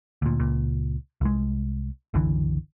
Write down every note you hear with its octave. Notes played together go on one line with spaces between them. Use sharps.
D2 A#2
C#2 A#2
C2 G#3
F#1 C2 D3 E3